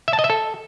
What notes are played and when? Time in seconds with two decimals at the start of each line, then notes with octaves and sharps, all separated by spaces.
0.08 E5
0.13 A5
0.19 D#5
0.24 E5
0.30 A4